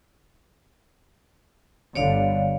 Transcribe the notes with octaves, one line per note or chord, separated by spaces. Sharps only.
G1 D3 G3 C#5 D5 F5